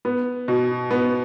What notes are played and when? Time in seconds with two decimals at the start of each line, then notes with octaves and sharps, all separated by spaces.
0.05 B3
0.48 B2
0.91 B3